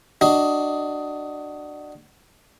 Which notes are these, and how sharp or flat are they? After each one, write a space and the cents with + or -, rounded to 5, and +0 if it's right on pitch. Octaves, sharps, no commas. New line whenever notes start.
D4 +20 F#4 +20 D#5 +10